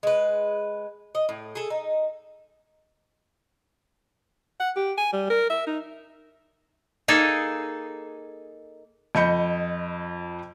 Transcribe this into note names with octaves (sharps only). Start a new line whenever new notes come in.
G#3 B4
D#5
A2
G#4 A4
D#4
F#5
G4
G#5
G3
A#4
E5
D#4
A#3 D#4 G#4 A4
F2 D#5 B5 G6 C#7